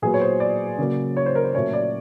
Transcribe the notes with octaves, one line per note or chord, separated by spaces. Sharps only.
A#2 F#3 B3 G#4
C#5
C5
D5
C#3 F#3 A#3
C#5
C5
A#4
C5
A#2 F#3 A3 C#4 C#5
D5